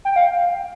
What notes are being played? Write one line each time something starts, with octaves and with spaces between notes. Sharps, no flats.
G5
F5